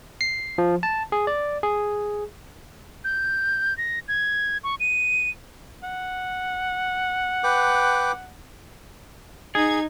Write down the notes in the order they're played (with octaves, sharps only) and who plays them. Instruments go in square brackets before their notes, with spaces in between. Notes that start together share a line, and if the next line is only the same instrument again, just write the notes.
[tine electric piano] C7
F3
A5
G#4
D5
G#4
[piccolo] G6
A#6
G#6
C#6
D#7
[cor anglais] F#5
[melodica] B4 G5 D6
[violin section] D#4 G#6 [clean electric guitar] G#4